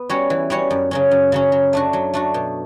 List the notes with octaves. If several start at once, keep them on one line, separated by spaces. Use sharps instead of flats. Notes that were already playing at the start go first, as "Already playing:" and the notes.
Already playing: B3
G3 C#4 F#4 C#5
E3
G3 C#4 F#4 C#5
F#2
C#3 F#3 C#4
F#2
C#3 F#3 C#4
F#3
A3 D4 F#4
F#3
A3 D4 F#4
B2